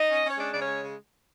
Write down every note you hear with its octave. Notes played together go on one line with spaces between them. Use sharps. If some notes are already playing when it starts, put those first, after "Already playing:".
Already playing: D#4 D#5
C#4
C#4
C#5
G#3 D4 D5
C#3 D5
C#4 C#5
G#3
C#3